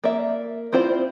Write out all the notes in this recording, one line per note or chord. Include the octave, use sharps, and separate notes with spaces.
A#3 D5 E5
C4 E4 F4 C5 D5